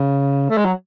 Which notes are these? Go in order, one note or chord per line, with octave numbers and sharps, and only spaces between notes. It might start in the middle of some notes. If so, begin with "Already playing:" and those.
Already playing: C#3
A3
G#3
F#3